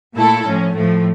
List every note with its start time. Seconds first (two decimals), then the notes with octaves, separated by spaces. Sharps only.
0.15 A#2 A3 E4 A4
0.45 A2 F3 C#4
0.74 A2 F3 A3